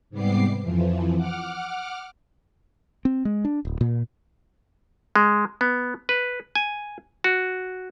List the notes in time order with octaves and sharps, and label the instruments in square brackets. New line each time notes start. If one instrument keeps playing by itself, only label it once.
[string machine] G#2 C3 G3 B3 D6 C7
F2 E3 F3
F#5 D6 F6
[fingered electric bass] C4
G#3
D4
D1
A#2
[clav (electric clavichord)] G#3
B3
B4
G#5
F#4